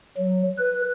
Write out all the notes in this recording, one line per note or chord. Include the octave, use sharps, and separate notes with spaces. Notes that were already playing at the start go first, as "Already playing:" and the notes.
F#3
B4